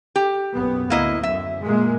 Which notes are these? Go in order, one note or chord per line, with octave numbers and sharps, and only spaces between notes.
G4
B1 F#2 B3
D2 A2 A#3 E4 D#5
F#2 E5
A#2 G#3 A#3